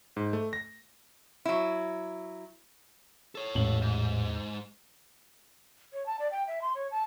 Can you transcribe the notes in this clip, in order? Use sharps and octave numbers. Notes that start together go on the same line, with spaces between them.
G#2
A3
A#6
F#3 E4
A4 C#5
A1 E2 A#2 G#3 F#7
G#2
C#5
A5
D5
G5
E5
C6
C#5
A5